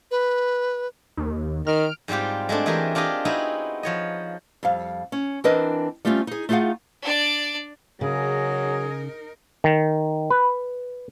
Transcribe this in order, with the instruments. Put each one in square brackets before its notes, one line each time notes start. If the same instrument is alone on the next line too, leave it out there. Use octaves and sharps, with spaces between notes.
[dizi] B4
[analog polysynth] D#2
[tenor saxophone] D#3 [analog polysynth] F6 D7
[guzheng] G#2 G3 C4 F4 G4
G#3 A3 C4 D4
E3 A3 G4 G#4 A#4
D4 F4 G4 G#4 D#5
B3 C4 D#4 E4 F#4 G#4
F3 C#5 D#5
[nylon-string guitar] F2 G3 F5
C#4
E3 C4 D4 A#4 B4 D#5
G3 A3 C4 C#4 F4
D#4 G#4
A3 D#4 F4 G#4 F5 F#5
[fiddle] D4 D5
[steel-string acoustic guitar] C#3 [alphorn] F#3 [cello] D#4 A#4 [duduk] G#4
[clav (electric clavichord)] D#3
B4